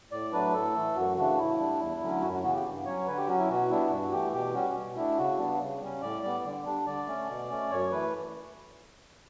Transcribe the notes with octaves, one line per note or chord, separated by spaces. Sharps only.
A2 D5
F#3 A3 D4 B4
A2 A4
E3 A3
F#2 F#4
C#3 E3 A3 D4 F#4
A2 E4
G3 D4
E2
D3 F#3 A3 C#4
F#2 F#4
F#4
C#3 E3 B3 F#4
G4
G2
F#3 C#4 C#5
D3 B4
G4
F#3 C#4 F#4
E4
B2 F#4
G3 B3 D4 E4
G2 F#4
E3 A3 G4
B2 G4
G3 C#4 F#4
B2
A3 D4 E4
C#3 F#4
G3 B3 D4
C#3
G3 C#4
A2 D5
G3 B3 D5
D3
G3 D4
D3 D5
A3 C#4
B2
A3 C#4
F#2 C#5
E3 A3 B4